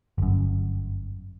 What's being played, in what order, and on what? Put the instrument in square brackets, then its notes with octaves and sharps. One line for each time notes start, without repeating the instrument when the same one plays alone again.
[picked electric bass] G1 F#2